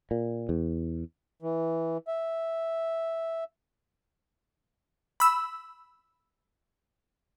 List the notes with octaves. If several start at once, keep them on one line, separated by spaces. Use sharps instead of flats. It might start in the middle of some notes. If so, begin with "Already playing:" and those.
A#2
E2
E3
E5
B5 E6